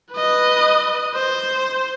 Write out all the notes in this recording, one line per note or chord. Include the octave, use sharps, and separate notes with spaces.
B4 D#5
C5